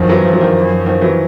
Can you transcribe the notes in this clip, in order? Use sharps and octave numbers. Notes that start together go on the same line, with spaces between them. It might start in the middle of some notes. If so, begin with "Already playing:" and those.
Already playing: F#2 D#3 F3
E3 F#3
G2 F3
F#3
D#3 F3
F#2
D#3 F3
E3 F#3